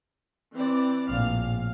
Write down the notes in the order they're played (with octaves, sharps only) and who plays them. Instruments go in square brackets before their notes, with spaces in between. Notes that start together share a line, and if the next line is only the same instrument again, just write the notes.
[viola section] E3 C4 D5
[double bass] A#1 A2 [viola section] F5